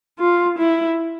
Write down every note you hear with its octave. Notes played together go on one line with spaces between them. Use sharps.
F4
E4